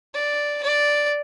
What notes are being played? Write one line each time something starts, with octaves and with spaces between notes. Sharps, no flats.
D5
D5